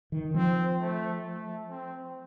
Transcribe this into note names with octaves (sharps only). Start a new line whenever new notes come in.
D#3
F3 C4
A3
A3
C4